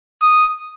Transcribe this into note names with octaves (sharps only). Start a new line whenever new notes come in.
D#6